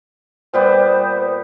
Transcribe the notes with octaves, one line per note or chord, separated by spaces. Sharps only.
A#2 G3 B3 C5